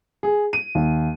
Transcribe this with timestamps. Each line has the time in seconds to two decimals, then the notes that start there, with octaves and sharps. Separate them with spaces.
0.23 G#4
0.53 D#7
0.75 D#2